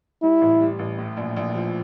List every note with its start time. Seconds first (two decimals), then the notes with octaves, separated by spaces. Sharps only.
0.22 G3 E4
0.41 A1
0.60 G3
0.79 A1
0.98 A2
1.17 A#1
1.36 A#1
1.55 F3